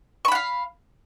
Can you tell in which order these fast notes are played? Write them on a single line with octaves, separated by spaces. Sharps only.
C#6 B5 F#5 F5